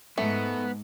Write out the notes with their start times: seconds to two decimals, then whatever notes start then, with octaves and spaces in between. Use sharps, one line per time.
0.18 G#2 A3 B3